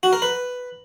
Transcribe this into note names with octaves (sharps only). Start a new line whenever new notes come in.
F#4
A#4
B4